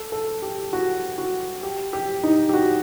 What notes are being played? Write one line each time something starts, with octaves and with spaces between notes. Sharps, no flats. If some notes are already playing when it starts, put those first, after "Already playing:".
Already playing: A4
A4
G4
F#4
F#4
G4
G4
D#4
G4
F#4